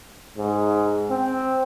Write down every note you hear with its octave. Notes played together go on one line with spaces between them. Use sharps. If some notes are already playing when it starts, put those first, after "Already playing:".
G#2
C4